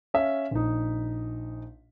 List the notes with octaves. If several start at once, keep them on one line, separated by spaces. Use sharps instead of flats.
C#4 E5 F5
A#1 D#4